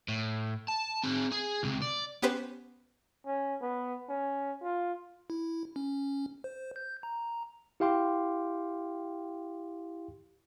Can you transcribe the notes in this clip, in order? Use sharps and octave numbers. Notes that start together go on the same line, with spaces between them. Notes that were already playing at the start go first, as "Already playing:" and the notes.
A2
A5
C4 G#4
G#4
C#2 C3
D5
B3 C#4 G4 B4 C5
C#4
B3
C#4
F4
E4
C#4
C5
G6
A#5
E4 G4 F5 G5 C6 D6